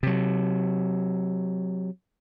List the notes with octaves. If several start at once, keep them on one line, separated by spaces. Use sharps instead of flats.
C3 F#3